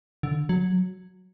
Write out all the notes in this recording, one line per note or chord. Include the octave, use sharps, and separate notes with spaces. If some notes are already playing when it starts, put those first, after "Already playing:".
D3
F#3